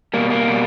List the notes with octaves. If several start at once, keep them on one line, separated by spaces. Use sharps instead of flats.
B2 G3 A#3
A#3
B2 G3